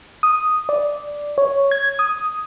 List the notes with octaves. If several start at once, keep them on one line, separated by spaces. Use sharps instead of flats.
D#6
D5
C#5
G#6
D#6